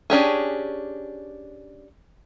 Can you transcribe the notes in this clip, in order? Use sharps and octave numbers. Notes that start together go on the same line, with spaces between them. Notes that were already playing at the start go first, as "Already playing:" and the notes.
C#4 D4 G4 G#4